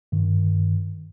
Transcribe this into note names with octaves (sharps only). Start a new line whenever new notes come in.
G2 D#3